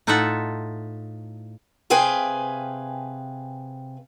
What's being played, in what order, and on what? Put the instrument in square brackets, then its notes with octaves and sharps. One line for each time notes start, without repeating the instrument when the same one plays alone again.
[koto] A2 D#4 F4 A4 E5 F#5
[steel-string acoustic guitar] C3 G#4 B4 F5 G5 G#5